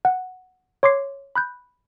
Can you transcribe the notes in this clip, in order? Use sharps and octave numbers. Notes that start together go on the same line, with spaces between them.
F#5
C#5 C6 D6 C7
B5 F#6 G6